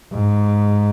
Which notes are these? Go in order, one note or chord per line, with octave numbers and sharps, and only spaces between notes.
G#2